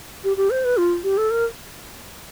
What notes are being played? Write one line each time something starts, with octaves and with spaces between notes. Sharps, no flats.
G4
G4
C5
B4
F4
G4
A4
A#4